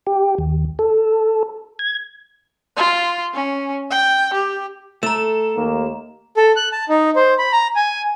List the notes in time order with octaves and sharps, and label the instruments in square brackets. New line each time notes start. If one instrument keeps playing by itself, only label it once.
[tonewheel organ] G4
D#2
A4
G#6
[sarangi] F4
C#4
G5
G4
[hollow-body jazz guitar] A3 [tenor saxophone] A4 [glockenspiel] A#5 E7
[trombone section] D#2 A#3
[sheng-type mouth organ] A4
F#6
A5
D#4
C5
B5
A#5
G#5